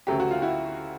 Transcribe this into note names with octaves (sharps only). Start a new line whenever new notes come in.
D2 C#3 F#3 A3 G4
F#4
F4
E4 F#4